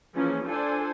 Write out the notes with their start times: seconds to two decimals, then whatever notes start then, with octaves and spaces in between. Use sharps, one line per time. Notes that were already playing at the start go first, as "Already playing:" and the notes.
0.14 E3 F3 A#3 C#4 G#4
0.46 D4 F4 A4 C5 G#5